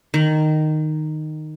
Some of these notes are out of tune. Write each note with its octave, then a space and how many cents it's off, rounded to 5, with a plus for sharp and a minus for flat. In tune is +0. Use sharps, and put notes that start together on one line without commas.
D#3 -10